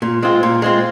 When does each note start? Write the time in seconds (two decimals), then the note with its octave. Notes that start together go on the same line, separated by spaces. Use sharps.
0.02 A#2
0.23 G#3 C4 F4
0.43 A#2
0.62 G#3 C4 F4